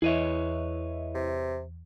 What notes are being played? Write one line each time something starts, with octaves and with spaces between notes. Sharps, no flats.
E2 E4 G#4 B4 C#5 D#5 E5
C3